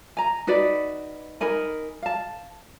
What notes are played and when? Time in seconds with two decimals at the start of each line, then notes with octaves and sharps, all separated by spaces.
0.17 G#5 A#5
0.47 D#4 F#4 B4 D5
1.41 D#4 A#4 G#5 B5
2.02 F5 A5